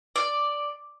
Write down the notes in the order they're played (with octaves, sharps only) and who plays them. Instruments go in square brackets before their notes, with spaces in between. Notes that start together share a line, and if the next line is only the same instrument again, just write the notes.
[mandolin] D5